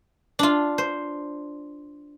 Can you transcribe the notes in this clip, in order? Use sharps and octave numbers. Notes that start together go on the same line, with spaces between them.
D4 F4
C5